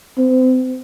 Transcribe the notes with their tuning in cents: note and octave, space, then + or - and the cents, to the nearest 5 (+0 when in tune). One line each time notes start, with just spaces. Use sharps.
C4 -30